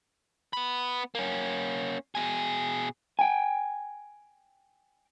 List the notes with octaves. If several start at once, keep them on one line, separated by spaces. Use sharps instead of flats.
B3 B5
A#3 C#4
B2 G#4
G5 G#5